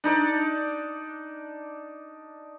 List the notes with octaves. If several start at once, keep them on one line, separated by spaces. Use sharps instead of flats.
D4 D#4 D5